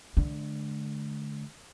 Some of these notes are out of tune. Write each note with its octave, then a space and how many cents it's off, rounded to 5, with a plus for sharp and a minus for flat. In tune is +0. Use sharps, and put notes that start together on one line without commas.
D3 +0 A3 -45